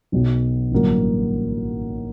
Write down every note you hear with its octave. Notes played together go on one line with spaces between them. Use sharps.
B1 B2 F#3 B3
A1 G2 D3 F#3 A#3